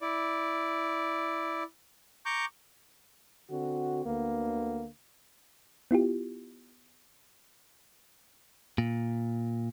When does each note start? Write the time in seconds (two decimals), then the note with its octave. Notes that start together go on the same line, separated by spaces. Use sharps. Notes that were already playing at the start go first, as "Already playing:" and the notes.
0.01 E4 D5
2.26 A#5 C#6 D6 G6
3.51 D3 C4 F#4
4.06 D2 D3 A#3 B3
5.91 B3 E4 F4 G4
8.78 A#2